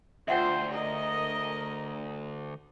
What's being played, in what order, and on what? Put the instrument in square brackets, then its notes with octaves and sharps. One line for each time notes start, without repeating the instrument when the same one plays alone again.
[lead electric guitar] D2 [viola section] F4 C5 [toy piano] E5 F#5 G5
[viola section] A#4 D#5